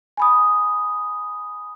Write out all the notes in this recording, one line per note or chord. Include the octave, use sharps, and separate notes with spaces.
G#5 B5 D#6